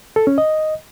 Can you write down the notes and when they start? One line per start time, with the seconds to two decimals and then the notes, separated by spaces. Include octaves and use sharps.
0.16 A4
0.27 C#4
0.38 D#5